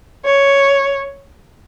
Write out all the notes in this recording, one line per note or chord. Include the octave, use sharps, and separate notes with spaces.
C#5